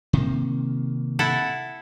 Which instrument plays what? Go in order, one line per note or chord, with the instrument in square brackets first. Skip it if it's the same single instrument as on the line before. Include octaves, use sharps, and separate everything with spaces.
[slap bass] C3 D#3 A#3
[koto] E4 A4 F#5